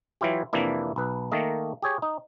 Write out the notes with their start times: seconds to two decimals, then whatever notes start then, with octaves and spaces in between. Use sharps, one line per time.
0.21 E3 F#3 E4 F4 G4
0.53 F2 C3 E3 A#3 D4 E4
0.96 B1 B4
1.31 D#3 A3 A#3 D#5
1.82 G4 G#4 C#5
2.02 D#4